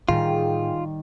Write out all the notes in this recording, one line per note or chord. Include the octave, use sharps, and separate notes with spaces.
A2 D#3 G3 F4 G#4